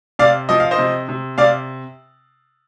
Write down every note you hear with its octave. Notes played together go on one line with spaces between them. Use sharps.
C3 D5 F5
F3 D#5
F5
C5 D#5
C3
C3
C3 D5 F5